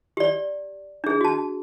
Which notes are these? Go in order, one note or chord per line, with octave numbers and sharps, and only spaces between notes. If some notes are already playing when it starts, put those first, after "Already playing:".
G4 D5
D4 G#4
F#4 A5